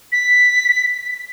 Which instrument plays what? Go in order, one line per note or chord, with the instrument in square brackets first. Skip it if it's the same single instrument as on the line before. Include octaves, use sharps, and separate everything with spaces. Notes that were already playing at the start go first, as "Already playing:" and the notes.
[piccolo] B6